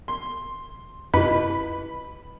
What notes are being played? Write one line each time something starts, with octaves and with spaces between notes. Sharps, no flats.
C6
F#2 C3 E4 F4 B4 D#5 B5